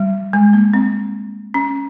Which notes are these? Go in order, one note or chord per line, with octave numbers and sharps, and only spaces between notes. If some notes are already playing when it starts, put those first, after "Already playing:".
Already playing: G3
G#3
A#3
C4
C#4